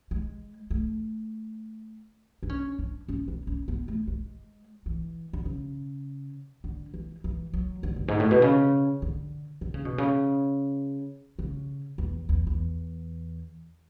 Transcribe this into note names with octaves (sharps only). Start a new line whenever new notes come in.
G#3
A3
D4
C#4
D4
C#4
D4
C#4
B3
A3
G#3
E3
D3
C#3
D3
E3
E3
F#3
D3
F#2
G#2
A2
B2
C#3
D3
D3
C#3
B2
C#3
C#3
E2
E2
E2